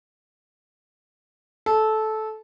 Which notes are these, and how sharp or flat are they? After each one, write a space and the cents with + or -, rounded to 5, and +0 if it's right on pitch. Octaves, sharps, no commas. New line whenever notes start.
A4 -15